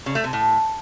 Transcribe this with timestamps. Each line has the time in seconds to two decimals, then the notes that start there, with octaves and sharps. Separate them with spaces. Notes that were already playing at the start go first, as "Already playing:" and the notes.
0.06 C#3
0.15 A3
0.24 C3
0.33 A2